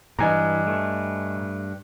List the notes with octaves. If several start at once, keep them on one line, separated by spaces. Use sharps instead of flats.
G2 E3 D#5 G#5 A#5
A3